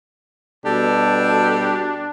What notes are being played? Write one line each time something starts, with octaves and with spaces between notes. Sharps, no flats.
B2 G3 D4 A4